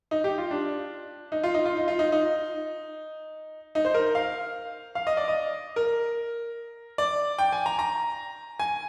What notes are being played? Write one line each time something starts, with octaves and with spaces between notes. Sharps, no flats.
D#4
G4
F4
D4
D#4
F4
D#4
F4
D#4
F4
D#4
D#4
D#4
C5
A#4
F5
F5
D#5
D5
D#5
A#4
D5
G5
G#5
A#5
A#5
G#5